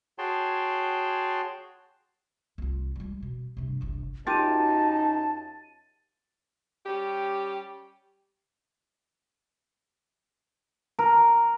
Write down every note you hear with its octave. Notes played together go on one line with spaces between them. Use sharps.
F#4 G#4 C#5 G5 A5 C6
C2 F4
G3 G#3
B2
G2 C3
G1 C2
F#2 D#4 F4 G4 A5 A6 D#7
G3 C#4 G4
A#4